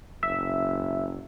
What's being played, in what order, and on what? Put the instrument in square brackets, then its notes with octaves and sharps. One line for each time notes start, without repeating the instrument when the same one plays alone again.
[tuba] F#1 [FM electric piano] E5